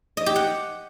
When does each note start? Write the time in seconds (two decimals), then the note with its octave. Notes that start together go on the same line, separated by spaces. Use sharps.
0.17 D#5
0.26 G4
0.36 F#5